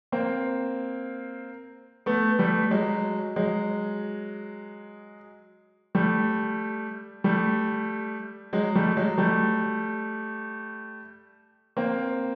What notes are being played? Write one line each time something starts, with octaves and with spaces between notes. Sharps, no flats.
A#3 C4
A3 B3
G3 A3
F#3 G#3
F#3 G#3
G3 A3
G3 A3
F#3 G#3
G3 A3
F#3 G#3
G3 A3
A#3 C4